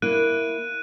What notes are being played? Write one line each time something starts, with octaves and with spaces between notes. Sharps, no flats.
A#3 E4 F#6 D7 D#7